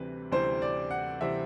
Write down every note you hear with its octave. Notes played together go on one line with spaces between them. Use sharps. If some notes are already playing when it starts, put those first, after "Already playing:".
Already playing: D2 C3 E3 G3 C4 B4
D2 C3 E3 G3 C4 C5
D5
F#5
C3 E3 G3 C4 E5